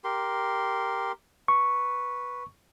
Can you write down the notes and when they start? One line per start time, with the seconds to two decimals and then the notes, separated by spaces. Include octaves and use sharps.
0.04 G4 A#4 C6
1.48 B4 C#6